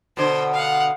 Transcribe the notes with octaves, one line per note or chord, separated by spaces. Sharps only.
B2 D3 C5
F5 F#5